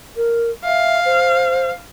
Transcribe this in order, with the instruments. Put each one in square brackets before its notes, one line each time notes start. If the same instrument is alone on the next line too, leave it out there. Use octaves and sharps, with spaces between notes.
[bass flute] A#4
[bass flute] E5 [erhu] F5
[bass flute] C5